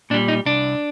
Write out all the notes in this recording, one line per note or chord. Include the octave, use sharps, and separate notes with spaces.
A#2 G3 D4
D#4
C2 D4